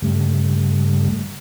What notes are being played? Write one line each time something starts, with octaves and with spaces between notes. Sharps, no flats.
G2 C#3 G3 A3